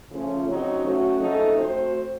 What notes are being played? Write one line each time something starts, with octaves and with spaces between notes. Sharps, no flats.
C#3 F3 A3 C#4 F4
C#3 F#3 C4 D#4 F#4
F#3 A3 C#4 F#4
F2 C#3 A3 D#4 A4
A3 C4 F#4 C5